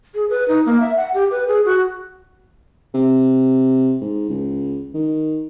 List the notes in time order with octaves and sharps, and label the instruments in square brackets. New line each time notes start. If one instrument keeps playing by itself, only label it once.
[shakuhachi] G#4
B4
D#4
A#3
E5
F#5
G4
B4
G#4
F#4
[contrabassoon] C3
G#2
C#2
D#3